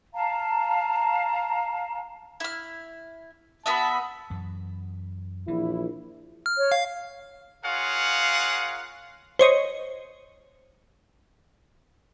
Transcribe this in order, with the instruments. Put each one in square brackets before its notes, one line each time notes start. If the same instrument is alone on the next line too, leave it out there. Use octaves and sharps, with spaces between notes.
[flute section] F5 A5 A#5
[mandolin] E4 F6
[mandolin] B3 F#4 E5 [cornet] A5 [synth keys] B5 D#6
[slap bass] F#2 E3
[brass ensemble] A#1 E4 [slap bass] E3
[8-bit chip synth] F6
[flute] C#5
[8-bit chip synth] F5
[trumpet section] F4 G#4 A#4 C#5 F5 F#5
[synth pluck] C5 C#5 D#5